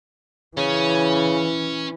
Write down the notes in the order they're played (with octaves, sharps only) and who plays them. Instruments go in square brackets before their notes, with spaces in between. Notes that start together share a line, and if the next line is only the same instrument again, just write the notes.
[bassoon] C#3 [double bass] E3 [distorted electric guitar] C#4